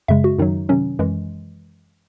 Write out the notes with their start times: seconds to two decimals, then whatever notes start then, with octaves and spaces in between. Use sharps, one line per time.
0.08 F#2 C#3 G#3 E5
0.24 F#4
0.38 F#2 D#3 F#3 D#4
0.69 C3 D#3 F#3 C#4
0.99 F#2 E3 G#3